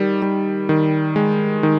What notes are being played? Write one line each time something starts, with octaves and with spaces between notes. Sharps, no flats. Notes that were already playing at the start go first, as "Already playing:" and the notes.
Already playing: D#3 G3
G3
D#3
G#3
D#3